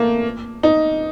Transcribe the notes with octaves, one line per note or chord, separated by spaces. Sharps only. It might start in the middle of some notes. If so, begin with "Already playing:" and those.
Already playing: A3 A#3
D#4